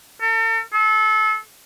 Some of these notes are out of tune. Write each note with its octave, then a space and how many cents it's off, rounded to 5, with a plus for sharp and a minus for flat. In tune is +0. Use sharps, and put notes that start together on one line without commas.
A4 +45
A4 -30